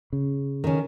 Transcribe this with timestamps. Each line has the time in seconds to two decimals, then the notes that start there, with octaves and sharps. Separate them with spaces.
0.13 C#3
0.64 D#3 C#4